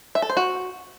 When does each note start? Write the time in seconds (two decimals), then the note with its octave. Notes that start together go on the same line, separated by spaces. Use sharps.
0.15 E5
0.22 A4
0.30 C5
0.37 F#4